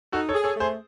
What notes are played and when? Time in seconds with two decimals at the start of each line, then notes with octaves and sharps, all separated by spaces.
0.12 D#4 F#4 A4
0.29 A4 C#5
0.33 G#4
0.44 A4 C#5
0.55 A3 G#4 C5